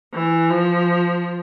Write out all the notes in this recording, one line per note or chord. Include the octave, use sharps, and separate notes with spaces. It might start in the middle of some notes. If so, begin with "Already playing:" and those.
E3
F3